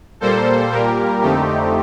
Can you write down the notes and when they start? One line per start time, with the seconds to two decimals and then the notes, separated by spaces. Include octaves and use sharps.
0.20 A#2 G3 A#3 A4 C5
0.71 A#2 G3 A#3 G4 A#4
1.22 F2 D3 A3 C4 D#4 G4